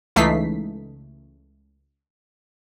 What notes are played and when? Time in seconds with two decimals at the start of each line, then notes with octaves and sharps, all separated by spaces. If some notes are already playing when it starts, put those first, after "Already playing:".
0.16 C#2 E3 A3 D#4 B6 C7